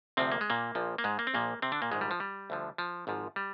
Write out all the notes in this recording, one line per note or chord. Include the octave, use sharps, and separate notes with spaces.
D2 C3 F3 C4
A#3
G#3
A#2 A#3
A#1 A#2 F3
A#3
G#2 G#3
A#3
C4
A#1 A#2 F3 A#3
C3 C4
D3 D4
A#2 A#3
A#1 G#2 D#3 G#3
G3
F3
G3
D2 D3 F3
F3
G#1 G#2 F3
G3